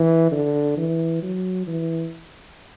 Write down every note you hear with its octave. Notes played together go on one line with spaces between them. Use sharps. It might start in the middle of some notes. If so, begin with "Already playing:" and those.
Already playing: E3
D3
E3
F#3
E3